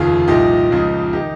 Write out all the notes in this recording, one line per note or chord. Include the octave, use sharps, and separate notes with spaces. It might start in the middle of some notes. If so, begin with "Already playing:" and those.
Already playing: F1 D#2 C#3 F3 F4 G#4
C2 A#2 F3 D#4 G4
C#2 C#3 F3
D#3 D#4 G4